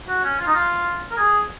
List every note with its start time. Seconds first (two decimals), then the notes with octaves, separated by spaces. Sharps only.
0.09 F#4
0.24 C#4
0.39 F4
0.47 D#4
0.55 F4
1.11 A#4
1.18 G#4